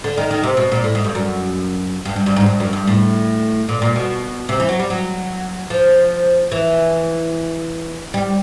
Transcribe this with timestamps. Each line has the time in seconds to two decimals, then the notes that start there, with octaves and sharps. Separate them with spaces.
0.04 D3
0.18 D#3
0.31 D#3
0.43 C3
0.57 B2
0.72 A#2
0.84 A2
0.95 G#2
1.04 G2
1.15 F#2
2.05 G2
2.16 G2
2.26 G2
2.36 G#2
2.46 G2
2.60 F#2
2.73 G2
2.87 A2
3.69 A#2
3.82 A#2
3.96 B2
4.49 C3
4.60 E3
4.69 F#3
4.80 G3
4.90 F#3
5.70 F3
6.52 E3
8.14 G3